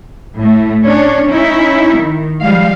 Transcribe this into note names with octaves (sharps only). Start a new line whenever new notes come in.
A2 A3
C#4 D4 C#5
C#4 D#4 E4
D#3
F3 G3 G#3 F5